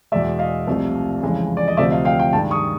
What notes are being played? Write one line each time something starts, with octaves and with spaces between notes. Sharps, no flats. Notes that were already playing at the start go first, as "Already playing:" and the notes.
E2 B2 G#3 D5 E5
D#5 F5
C2 C3 F3 A3
F2 C#3 E3 G#3
D5
D#5
D2 C3 F3 A3 D5 E5
D#5 F5
F5 G5
F5 G5
G2 D#3 G#3 G5 A5
C#6 D#6